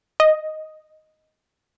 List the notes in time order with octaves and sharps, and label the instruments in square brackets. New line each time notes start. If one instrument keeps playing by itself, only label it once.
[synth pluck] D#5